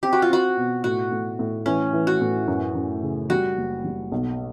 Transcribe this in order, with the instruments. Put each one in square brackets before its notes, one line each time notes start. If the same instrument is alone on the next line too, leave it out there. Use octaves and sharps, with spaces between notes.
[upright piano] C4 [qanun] G4
[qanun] F#4
F4
[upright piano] C4 [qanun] F#4
[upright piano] B2
[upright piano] A2 [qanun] F#4
[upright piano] A2
A2
[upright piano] E3 [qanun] C#4
[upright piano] E3
[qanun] F#4
[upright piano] A2
F#2
F#2
C#3
[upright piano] G3 [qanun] F#4
[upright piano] F#1
G3
B1